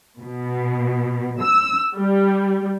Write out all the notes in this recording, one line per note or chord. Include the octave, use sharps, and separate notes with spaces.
B2
E6
G3